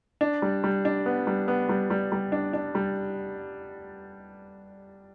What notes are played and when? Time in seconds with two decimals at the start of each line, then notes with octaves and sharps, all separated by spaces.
0.21 D4
0.42 G3
0.64 G3
0.85 D4
1.06 B3
1.27 G3
1.48 B3
1.69 G3
1.90 G3
2.12 G3
2.32 D4
2.53 D4
2.75 G3